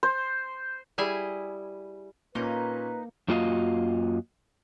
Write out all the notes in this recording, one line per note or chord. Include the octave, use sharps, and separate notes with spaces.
C5
G3 E4 G#4 G#5
A#2 A#3 C#4 D#4 B4
F#2 A#3 F4 F#4 D#5 F5